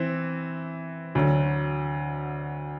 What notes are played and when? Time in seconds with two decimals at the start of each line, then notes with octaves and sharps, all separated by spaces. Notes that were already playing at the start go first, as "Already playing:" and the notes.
Already playing: E3 C4 E4
1.15 D2 D3 F#3